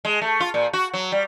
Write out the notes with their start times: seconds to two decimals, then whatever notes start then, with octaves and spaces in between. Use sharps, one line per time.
0.05 G#3
0.22 A3
0.40 F4
0.54 A#2
0.73 F#4
0.94 F#3
1.12 G3